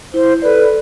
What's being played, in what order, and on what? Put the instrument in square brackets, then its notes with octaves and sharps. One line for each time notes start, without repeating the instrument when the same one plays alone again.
[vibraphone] E4 [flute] C5
[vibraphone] A4 D5 [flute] B4